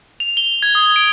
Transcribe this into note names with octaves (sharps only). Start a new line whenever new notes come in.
F7
G7
G#6
D#6
D7